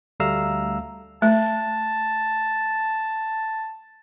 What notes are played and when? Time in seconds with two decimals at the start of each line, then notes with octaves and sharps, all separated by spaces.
0.20 D2 G3 A3 F5 A#5 E6
1.22 A3 A5